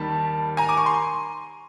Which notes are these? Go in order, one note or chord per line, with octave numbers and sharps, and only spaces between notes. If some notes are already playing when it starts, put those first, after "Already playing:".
Already playing: D#2 D#3 G3 A5 B5
G#5 A#5
D6
C#6
C6